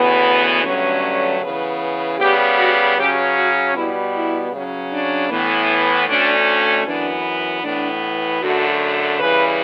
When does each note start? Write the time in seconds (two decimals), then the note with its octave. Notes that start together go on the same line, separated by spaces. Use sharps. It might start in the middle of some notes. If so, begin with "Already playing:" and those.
Already playing: D2 C#3 E3 B3
0.64 G2 D3 F#3 A3 C#4 C#5
1.41 C#3 E3 B3 B4
2.19 C#3 G3 B3 G4
2.58 F#4
2.97 C#3 F#3 C#4 G4
3.35 F#4
3.74 B2 G3 B3 E4
4.13 E4
4.52 C#3 F#3 C#4
4.91 D4
5.30 A2 E3 B3
6.07 D2 D3 A3 C#4 D4
6.85 F#2 E3 B3 D4
7.63 A2 E3 B3 D4
8.40 F#2 D3 A3 F#4
9.18 C#3 E3 G3 B4